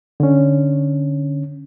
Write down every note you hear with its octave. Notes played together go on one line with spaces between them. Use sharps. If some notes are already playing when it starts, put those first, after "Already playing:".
D3 C#4